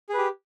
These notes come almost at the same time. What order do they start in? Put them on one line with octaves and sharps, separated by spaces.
G#4 B4 G4